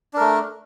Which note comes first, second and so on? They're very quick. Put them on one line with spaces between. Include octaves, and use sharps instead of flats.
D4 A#4 A3